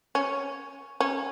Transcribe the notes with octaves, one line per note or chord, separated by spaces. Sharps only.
C#4
C#4